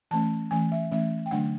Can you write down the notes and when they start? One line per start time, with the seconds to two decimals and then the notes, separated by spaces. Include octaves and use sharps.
0.11 E3 A3 C#4 A5
0.51 E3 A3 C#4 G#5
0.72 E5
0.91 E3 A3 C#4 E5
1.26 G5
1.31 D3 F#3 A3 D4 F#5